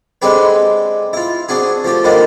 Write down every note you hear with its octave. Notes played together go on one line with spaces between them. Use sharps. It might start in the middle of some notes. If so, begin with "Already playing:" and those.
D3 G#3 C4 G4 B4
E4 F4
C4 D4 F#4 G#4
F3 A3 G4
G#2 D3 D#3 F3 G3 A#3